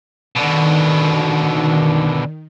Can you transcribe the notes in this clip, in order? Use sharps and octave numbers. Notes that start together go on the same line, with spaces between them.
B2 D3 D#3